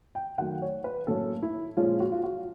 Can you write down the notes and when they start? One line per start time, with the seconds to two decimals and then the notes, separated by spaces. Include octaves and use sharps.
0.15 G5
0.38 D#3 F#3 A3 F#5
0.62 C#5
0.84 B4
1.07 A2 F#3 A#3 C#4 A4
1.43 E4
1.77 A#2 F3 G#3 C#4 F4
2.00 F#4
2.12 F4
2.23 F#4